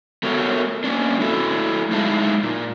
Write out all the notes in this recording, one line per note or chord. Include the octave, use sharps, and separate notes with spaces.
A3 B3 F#4 A#4 C#5
A#3 C#4 D4
A3 E4 F#4 A4
G#3 D#4 E4 F5 A5
A#2